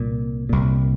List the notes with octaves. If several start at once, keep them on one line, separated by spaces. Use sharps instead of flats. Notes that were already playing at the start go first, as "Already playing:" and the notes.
Already playing: C2 A#2
C2 A#2